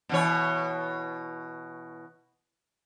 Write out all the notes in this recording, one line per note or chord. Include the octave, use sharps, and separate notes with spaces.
B2 E3 C#5